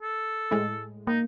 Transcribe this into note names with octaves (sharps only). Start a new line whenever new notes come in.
A4
A2 G#3
A#3 D#4